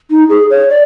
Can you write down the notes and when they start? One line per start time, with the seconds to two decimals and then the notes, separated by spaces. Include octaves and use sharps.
0.11 D#4
0.29 G#4
0.50 C#5
0.69 D5